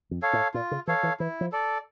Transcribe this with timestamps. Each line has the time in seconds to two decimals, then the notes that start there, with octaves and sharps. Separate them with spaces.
0.11 F2
0.22 A4 C#5 F5
0.33 A2
0.54 A#2 F4
0.71 C#3
0.87 E3 A4 C#5 F5
1.03 E3
1.20 E3 E4
1.41 F3
1.52 A4 D5